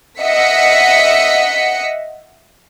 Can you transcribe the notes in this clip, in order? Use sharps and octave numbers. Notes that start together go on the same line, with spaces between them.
D#5 E5 F#5 B6 C#7